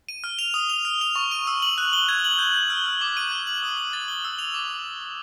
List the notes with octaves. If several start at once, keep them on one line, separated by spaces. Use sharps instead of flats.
D#7
F6
F7
D#6
F7
F6
F7
C#6
D#7
E6
F#7
F#6
G7
G#6
F#7
G6
G6
F6
F6
D6
D#7
G6
F#7
D#6
D#6
A6
G7
E6
F7
D6